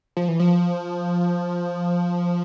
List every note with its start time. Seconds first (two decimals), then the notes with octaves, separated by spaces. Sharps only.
0.17 F3
0.28 E3
0.40 F3